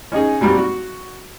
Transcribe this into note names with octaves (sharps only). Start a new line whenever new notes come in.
C#4 D#4 G#4
A#2 F#3 G3 C4
F#4